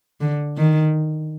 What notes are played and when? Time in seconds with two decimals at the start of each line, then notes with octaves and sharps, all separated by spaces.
0.21 D3
0.57 D#3